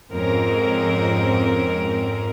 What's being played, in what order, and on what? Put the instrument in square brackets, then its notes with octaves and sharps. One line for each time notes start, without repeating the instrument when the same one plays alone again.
[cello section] F2 G#2 C4 C#4 A#4